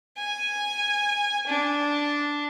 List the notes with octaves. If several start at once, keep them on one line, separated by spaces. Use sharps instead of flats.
G#5
D4